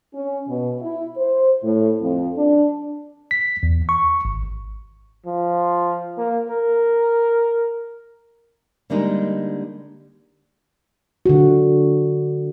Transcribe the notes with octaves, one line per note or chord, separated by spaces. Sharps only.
C#4
B2
E4
C5
A2
F2
D4
B6
E2
C#6
G#1
F3
A#3
A#4
D3 G3 G#3 A#3 D4 D#4
D3 F#4